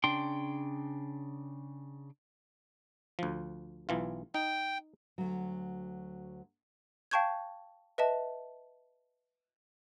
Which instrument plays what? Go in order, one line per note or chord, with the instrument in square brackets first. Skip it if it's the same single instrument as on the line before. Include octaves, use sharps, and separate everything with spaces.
[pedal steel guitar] C#3 D4 G5 C6
[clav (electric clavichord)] D2 F3
B1 E3 F4
[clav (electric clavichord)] D#4 [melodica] G5
[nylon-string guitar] D2 F#3
[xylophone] F5 G5 A5 C#6 G6 G#6
B4 D#5 E5 A5